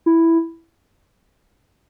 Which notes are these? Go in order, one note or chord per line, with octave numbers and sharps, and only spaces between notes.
E4